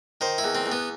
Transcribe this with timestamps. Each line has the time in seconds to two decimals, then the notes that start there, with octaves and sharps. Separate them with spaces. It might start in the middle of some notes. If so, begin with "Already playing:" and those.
0.21 D#3 C5
0.38 E4
0.44 E2
0.55 C4
0.66 E2
0.72 B3